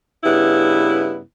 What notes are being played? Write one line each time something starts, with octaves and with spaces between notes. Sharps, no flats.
G2 C#3 B3 E4